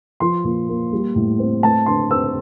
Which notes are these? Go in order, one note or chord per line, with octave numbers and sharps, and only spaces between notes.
F3 C6
A#2
A#3
G3
A2
C4
A3 A5
D3 C6
C4 E6